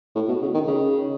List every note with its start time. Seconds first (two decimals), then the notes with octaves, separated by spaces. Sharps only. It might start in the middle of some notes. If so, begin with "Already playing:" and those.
0.15 A2
0.28 B2
0.42 C#3
0.54 D#3
0.67 C#3